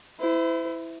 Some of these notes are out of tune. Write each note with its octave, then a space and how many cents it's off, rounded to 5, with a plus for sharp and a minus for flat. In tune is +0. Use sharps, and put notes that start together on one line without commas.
E4 +0 C5 -40